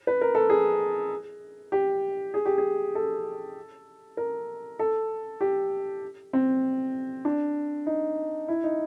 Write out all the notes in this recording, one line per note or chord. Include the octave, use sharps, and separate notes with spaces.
B4
A#4
A4
G#4
G4
G#4
G4
G#4
A4
A#4
A4
G4
C4
D4
D#4
E4
D#4